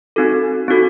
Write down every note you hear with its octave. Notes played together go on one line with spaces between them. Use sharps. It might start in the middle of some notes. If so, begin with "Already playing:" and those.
C4 D#4 F#4 A4
C4 D#4 F#4 A4